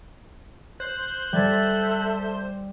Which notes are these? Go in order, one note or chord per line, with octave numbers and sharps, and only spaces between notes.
C5 F#6
G3 A4 E5 G#6 A6